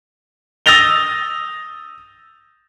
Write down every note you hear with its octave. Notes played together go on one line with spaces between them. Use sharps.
D#6 E6 A6 A#6 F7 G7